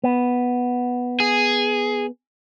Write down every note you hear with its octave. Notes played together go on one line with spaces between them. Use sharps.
B3
G#4